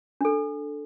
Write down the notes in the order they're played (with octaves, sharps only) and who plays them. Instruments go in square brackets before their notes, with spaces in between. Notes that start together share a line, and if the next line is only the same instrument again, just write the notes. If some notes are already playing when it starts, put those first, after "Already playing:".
[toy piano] D4 A4